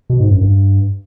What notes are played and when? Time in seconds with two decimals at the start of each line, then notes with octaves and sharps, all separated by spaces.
0.10 B2
0.20 G#2
0.31 F#2
0.41 G2